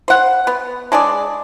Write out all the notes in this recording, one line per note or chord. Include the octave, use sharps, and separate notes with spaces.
C5 F#5
B3
G#3 D4 G#4 D5